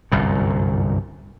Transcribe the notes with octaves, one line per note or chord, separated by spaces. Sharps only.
G1 C2 F#2 A#2